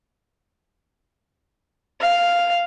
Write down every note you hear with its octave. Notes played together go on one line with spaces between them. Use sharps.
F5